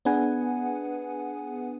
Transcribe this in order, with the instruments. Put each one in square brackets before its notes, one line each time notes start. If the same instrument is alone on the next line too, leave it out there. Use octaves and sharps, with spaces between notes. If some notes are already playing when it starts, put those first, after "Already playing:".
[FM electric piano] B3 D4 G#4 B4 F#5 G#5